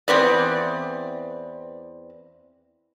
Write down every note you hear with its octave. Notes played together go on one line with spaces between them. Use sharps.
E2 C4 B4 D5